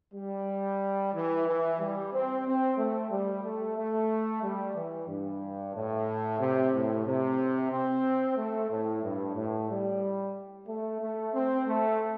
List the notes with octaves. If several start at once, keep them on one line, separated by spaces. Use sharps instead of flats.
G3
E3
E3
G3
C4
C4
A3
G3
A3
A3
G3
E3
G2
A2
C3
A2
C3
C4
A3
A2
G2
A2
G3
A3
A3
C4
A3